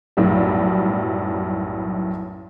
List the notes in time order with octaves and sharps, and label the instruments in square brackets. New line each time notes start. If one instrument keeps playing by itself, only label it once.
[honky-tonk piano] B1 F#2 A2 G3